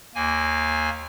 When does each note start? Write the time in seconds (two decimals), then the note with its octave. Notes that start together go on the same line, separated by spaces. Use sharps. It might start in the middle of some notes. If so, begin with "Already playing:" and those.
0.15 D#2 A#3 G#5